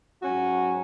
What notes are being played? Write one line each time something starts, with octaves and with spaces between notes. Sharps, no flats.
G#2 F#3 C#4 F#4